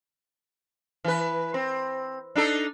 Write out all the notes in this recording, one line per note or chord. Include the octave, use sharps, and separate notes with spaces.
E3 B4
C4
D4 D#4 A4